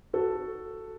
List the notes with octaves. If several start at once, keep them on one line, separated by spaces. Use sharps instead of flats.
F#4 A4